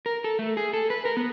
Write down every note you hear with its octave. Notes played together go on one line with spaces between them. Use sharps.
A#4
A4
A3
G#4
A4
B4
A#4
B3